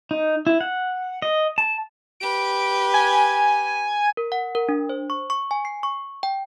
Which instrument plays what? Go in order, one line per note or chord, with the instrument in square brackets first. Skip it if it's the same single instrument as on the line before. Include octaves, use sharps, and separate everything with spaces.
[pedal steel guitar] D#4
E4
F#5
D#5
A5
[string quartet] G4 B4 [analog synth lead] D7
[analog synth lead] G#5
[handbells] A#4
F#5
A#4
D4
C5
C#6
C#6
G#5
C7
C#6
G5